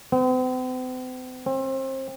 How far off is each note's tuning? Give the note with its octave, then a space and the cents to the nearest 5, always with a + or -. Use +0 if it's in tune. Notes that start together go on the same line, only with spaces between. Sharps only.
C4 -45
C4 +30